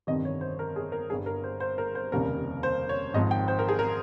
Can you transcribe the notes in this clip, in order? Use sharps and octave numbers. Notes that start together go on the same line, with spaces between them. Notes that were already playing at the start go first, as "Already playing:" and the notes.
G1 F2 C3 D#3 G3 D#5
C#5
C5
A#4
G#4
A#4
G1 G2 G3 G#4
A#4
C5
C5
A#4
C5
F1 D#2 C#3 G3 A#4
C5
C#5
G#1 G#2 F3 D#5
G5
C5
A#4
G#4
A#4